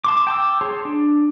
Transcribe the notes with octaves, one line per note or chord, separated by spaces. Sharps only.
A5 C6 D6
G5 A5 D6 E6
G#4 C#5 A5 C6
D4